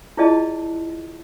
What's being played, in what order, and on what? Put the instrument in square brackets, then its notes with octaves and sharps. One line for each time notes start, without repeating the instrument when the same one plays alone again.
[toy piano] E4 F4 G#4 D5 D#5 A5